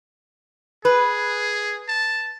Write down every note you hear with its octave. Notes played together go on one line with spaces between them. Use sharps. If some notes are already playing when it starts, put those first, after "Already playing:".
G#4 B4
A5